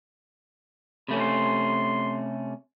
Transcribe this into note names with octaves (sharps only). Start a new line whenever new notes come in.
C3 A3 C#4 B5
C6